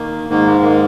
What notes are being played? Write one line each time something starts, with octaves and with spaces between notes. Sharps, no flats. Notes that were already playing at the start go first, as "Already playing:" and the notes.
Already playing: D#3 A#3
G#2 D#3 A#3
G#3
A#3